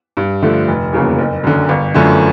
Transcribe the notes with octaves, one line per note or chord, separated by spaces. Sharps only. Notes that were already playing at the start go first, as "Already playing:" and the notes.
G2
D3 F3 A3
F1
E2 C#3 F#3 A#3
F#1
F#2 D3
G1
F#2 D3 F3 A3